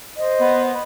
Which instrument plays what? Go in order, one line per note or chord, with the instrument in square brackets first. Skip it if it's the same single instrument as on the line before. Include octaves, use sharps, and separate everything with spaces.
[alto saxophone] C5 [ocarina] D#5
[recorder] B3